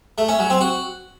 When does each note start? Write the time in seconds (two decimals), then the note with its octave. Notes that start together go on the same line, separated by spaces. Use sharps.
0.18 A3
0.28 C#4
0.39 F#3
0.50 C4
0.61 F#4